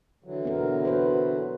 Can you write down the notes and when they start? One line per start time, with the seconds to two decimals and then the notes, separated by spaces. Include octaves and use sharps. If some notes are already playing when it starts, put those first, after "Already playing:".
0.24 D3 E3 F#3
0.45 B3 A#4
0.85 F#4 B4 C5